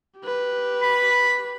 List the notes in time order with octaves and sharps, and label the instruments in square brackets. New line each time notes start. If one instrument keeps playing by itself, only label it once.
[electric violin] G4 B4
[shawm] B5